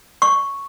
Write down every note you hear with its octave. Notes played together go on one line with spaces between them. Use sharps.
C#6